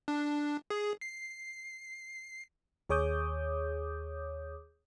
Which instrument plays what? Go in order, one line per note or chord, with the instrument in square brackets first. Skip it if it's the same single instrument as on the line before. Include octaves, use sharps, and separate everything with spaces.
[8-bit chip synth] D4
G#4
C7
[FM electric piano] D#2 G#4 C#5 D6 D#6 G6